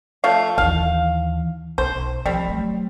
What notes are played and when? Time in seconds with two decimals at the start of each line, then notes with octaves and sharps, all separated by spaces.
0.24 F3 A3 F5
0.58 D#2 E3 F5
1.78 B1 C5
2.26 F3 G3 C4
2.49 F#3 A3